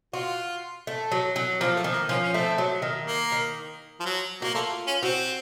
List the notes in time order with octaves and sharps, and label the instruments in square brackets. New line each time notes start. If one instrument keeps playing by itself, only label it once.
[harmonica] F4 [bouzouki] F#4
[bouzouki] A3
F#3
F#3
[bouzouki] F3 [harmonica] A#3
[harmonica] A3
[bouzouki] D#3
[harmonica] A#3
[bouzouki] F3 [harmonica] C#4
[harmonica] C#4
[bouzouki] A3 [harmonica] C4
[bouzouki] F#3
D#3
[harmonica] A#3
[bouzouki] D#3
[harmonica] F3
F#3
[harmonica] A#3 [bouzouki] F#4
[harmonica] A3 [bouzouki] F4
[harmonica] C#4
[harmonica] C4 [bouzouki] F#4